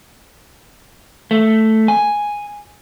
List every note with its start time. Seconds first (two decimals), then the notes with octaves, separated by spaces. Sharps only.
1.31 A3
1.88 G#5